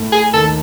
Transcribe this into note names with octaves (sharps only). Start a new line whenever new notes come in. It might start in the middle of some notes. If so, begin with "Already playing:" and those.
Already playing: A2 A3
G#4
D#2 D#3 A4